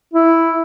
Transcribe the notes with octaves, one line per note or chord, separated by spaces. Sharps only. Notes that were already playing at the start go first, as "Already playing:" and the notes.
E4